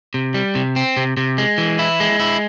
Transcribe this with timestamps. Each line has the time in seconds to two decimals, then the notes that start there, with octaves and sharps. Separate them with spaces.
0.14 C3
0.34 G3
0.55 C3
0.76 C4
0.97 C3
1.17 C3
1.38 G#3
1.58 E3
1.79 E4
2.00 G#3
2.20 E4